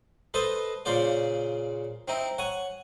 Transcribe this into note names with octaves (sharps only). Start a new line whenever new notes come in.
A4 B4 C5 D#5
A#2 C#3 C5 D5
C4 D#4 E4
C#5 F#5 G#5